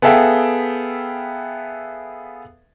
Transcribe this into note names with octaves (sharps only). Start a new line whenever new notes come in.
B3 G#4 A4 E5 F5 G5